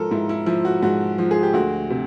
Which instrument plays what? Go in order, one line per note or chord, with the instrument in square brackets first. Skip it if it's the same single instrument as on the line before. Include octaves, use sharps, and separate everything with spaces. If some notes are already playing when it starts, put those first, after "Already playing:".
Already playing: [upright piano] G#2 F3 A4 A#4
G#2 E4
E4
F3 E4
F#4
G#2 F#4
F3
G#4
G4
D2 F#4
C3